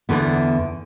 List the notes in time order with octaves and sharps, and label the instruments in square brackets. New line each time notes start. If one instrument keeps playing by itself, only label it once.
[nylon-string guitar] E2 D3 B3